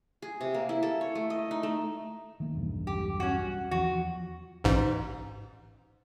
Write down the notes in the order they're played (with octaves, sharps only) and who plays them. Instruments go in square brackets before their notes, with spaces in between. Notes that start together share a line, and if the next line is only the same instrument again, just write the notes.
[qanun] G#4
C3
A#3
E4
A4
C#5
A3
D#5
D#4
A3
[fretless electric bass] D#3 A#3
B1 E2 G2
[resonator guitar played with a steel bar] G4
C#4 F#4
[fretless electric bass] E2 F3 [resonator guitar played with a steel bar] F#4
[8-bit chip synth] A1 G#2